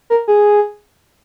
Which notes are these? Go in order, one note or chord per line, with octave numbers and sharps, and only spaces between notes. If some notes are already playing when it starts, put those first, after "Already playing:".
A#4
G#4